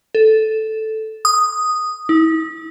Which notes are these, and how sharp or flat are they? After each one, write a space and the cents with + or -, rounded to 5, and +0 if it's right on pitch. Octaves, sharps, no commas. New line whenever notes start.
A4 -5
D#6 -5
E4 -40